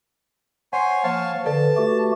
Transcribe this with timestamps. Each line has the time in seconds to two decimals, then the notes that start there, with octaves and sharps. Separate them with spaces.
0.73 C5 C#5 F#5 G#5 C7
1.04 F3 A#3 C#5 F5 A5
1.46 D3 A4 B4 D5 A5
1.77 A3 F#4 G4